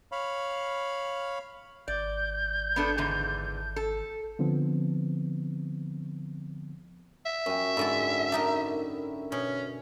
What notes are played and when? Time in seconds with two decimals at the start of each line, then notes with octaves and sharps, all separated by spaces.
0.12 C#5 F5 B5
1.88 G#1 D5 G6
2.76 B3 D4 A4
2.98 E2 G#2 D3
3.76 A4
4.39 D3 F3 B3 C4
7.26 E5
7.46 F#2 C#4 G5
7.77 G#2 D3 G#3 E4 A5
8.32 D4 D#4 A#4
9.32 B2 C#4